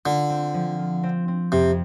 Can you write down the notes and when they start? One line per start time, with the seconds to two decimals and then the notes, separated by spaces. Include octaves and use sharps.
0.06 D3 F4
0.30 C4
0.54 F3
0.79 F4
1.03 C4
1.28 C4
1.52 F2 C3